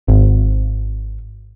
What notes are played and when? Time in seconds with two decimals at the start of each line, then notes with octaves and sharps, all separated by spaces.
0.08 G#1